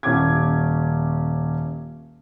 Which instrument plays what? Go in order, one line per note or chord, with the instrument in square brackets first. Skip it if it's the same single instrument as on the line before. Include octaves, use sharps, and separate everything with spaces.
[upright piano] D#1 C#4 E4 D6 G#6